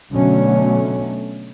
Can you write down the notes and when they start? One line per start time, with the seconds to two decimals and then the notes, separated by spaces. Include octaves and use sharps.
0.12 B2 D3 F#3 A3 C#4